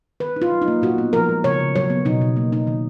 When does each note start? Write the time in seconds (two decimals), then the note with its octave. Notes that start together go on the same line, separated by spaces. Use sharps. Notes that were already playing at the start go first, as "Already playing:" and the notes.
0.20 D#3 B4
0.36 D#4
0.42 F4
0.52 F#3
0.62 D#4
0.68 A#3
0.82 A#2 F#4
0.98 B3
1.13 F3 A#4
1.29 G#3
1.44 C#3 C#5
1.60 C#3
1.75 F#3 C#5
1.90 B3
2.05 B2 D#4
2.21 B2
2.36 A#3
2.52 D#4
2.67 D#3